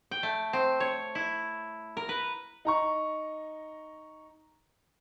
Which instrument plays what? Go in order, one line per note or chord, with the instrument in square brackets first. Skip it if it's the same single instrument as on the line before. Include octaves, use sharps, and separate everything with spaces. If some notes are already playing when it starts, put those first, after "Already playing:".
[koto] G5
A3
C4
C#5
E4
A#4
B4
[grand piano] D#4 A#5 C#6